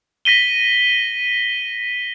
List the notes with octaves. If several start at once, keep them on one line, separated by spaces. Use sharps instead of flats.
A#6 B6 D#7 G7